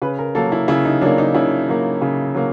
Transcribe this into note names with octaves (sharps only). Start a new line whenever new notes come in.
C#3 B4
A#4
F#3 A#3 A4
E4
C#3 E4
D#4
F#3 A#3 D4
D#4
C#3 E4
F#3 A#3
C#3
F#3 A#3